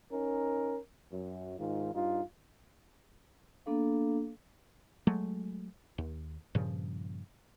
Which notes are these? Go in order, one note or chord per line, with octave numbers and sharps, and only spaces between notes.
C#4 D#4 A#4
F#2
G#2 D#3 F4
G2 D#4 F4
A#3 B3 D4 A4 F5
F#3 G#3 A3
D#2
G2 A#2 C#3 F3